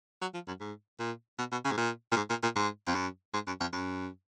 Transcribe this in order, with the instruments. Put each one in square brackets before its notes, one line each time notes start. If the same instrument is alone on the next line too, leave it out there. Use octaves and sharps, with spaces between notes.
[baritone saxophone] F#3
F3
F#2
G#2
A#2
B2
B2
C#3
G#2
A#2
A#2
G#2
A#2
A#2
G#2
F2
F#2
G#2
F#2
F2
F#2